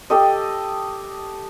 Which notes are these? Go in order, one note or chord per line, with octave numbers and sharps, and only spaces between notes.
G4 A4 D#5